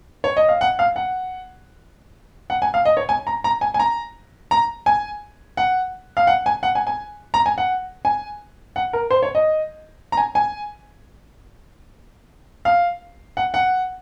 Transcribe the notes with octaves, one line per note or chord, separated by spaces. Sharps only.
C#5
D#5
F5
F#5
F5
F#5
F#5
G#5
F5
D#5
C#5
G#5
A#5
A#5
G#5
G#5
A#5
A#5
G#5
F#5
F5
F#5
G#5
F#5
G#5
G#5
A#5
G#5
F#5
G#5
F#5
A#4
C5
C#5
D#5
A#5
G#5
G#5
F5
F#5
F#5